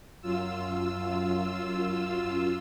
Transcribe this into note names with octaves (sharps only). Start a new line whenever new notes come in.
F#2 F4 E6